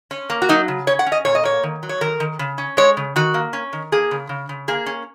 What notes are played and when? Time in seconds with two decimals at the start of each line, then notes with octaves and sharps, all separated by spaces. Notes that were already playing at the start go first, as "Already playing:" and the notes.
0.11 C#4
0.30 A#3
0.42 F#4
0.49 F#3 D#4
0.68 C#3
0.87 C#4 C#5
0.99 F#5
1.06 C#4
1.12 D#5
1.25 A#2 C#5
1.35 D#5
1.44 A#3 C#5
1.63 D#3
1.83 F#3
1.89 C#5
2.01 D#3 A#4
2.20 D#3
2.39 C#3
2.58 C#4
2.77 G#3 C#5
2.97 C#3
3.16 D#3 F#4
3.34 A#3
3.53 C#4
3.73 D#3
3.92 A#3 G#4
4.11 C#3
4.29 C#3
4.49 C#3
4.68 A#3 G#4
4.86 C#4